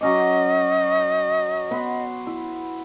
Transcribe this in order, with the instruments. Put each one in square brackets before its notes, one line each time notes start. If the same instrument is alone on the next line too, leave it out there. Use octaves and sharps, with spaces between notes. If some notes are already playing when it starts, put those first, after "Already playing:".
[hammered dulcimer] F#3 C#4 D6 [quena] D#5
[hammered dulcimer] B3 B5 C6
E4